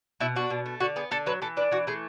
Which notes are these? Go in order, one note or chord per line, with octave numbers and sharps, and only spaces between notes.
B2 E4
D4 F#4
B2
A3
D3 F#4
B3 G#4
D3 A4
F#3 B4
E3 A4
D4 B4
E3 F#4
A3 G#4